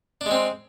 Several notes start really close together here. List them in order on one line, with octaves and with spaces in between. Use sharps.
D4 G#3 C4